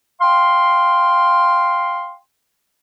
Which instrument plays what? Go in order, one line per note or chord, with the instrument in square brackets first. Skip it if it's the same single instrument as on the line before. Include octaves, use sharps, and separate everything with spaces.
[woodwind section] F5 G5 C6